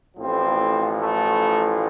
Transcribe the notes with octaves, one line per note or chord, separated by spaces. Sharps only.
A1 A2 F3 C4
A3